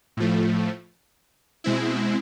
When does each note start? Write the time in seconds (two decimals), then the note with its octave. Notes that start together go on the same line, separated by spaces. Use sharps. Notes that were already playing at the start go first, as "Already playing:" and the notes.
0.17 A2 F3 A3
1.64 B2 G#3 C4 E4